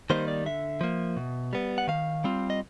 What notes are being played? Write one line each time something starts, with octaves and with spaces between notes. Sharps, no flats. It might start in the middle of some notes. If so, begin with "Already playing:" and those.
D#3 G3 A#3 D#4 C5
D5
D3 E5
F3 A#3
B2
G3 B3
F#5
D#3 F5
G3 C4 F4
D#5